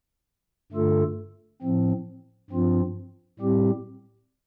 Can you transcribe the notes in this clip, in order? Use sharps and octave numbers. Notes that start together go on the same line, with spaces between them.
G2 D3 A3 F4 A4
A2 F3 C4
G2 F3 C4 F4
A2 G3 C4 G4